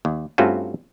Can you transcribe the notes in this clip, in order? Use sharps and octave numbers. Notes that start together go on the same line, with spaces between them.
D#2
G2 A3 C4 C#4 F4 F#4